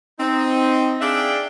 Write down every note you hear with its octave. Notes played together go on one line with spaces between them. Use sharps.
C4 D#4
D4 G#4 D5 E5 F5 G5